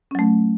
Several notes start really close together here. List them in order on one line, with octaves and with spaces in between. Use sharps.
C#4 F#3 A3